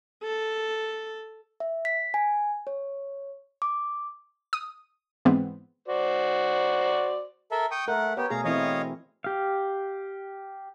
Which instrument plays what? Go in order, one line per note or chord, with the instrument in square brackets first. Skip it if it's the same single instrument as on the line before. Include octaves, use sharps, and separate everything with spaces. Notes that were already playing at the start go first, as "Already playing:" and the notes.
[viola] A4
[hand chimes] E5
B6
G#5
C#5
D6
[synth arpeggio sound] D#6
G#2 E3 B3 C4
[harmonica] F#4 C5 D5
[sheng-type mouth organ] A4 A#4 E5
G5 C#6 D#6
[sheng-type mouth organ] A3 F#5 [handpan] A#4
[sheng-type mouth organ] B3 G4 [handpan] C#5
[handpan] B2 A3 G#4 [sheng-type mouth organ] F5 A#5
[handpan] E3 C4 E4 [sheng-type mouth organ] C#5 D#5 F5
[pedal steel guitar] G4 F5